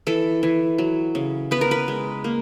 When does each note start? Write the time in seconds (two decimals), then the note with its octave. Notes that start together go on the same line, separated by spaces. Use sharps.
0.07 E3 A4
0.43 E3
0.78 F#3
1.15 C#3
1.51 B3 B4
1.61 A#4
1.71 B4
1.88 G#3
2.24 A#3